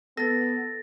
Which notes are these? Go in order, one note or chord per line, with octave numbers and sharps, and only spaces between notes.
B3 A4 A6 A#6